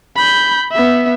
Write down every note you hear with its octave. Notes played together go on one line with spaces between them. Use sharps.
B5 G6
B3 E5